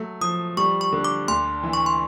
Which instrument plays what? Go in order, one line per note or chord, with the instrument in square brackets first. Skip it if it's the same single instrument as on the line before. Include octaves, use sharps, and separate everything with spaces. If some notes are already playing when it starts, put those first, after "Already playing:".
Already playing: [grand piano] F#3 A3
[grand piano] F3 [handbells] D#6
[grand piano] G3 [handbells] C#6
[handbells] C#6
[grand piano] D3
[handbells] D6
[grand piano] D2 [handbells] C6
[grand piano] E3
[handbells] C#6
C6